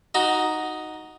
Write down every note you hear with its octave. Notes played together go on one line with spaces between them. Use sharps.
D#4 F#4